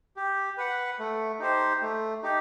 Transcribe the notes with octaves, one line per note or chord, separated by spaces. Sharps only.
G4
B4 F#5
A3
D#4 G4 C5
A3
D#4 G4